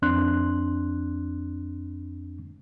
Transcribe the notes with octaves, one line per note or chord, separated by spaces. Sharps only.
F2 C4 D4 C6 F#6